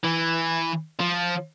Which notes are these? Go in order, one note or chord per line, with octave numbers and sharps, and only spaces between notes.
E3
F3